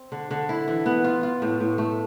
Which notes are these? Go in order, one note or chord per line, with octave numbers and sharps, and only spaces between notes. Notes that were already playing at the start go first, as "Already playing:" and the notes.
Already playing: C4
D3
D3
E4
E3
B3
F4
F4
A2
A2
A3